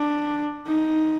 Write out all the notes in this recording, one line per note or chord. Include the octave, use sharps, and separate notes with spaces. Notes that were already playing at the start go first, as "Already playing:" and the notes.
Already playing: D4
D#4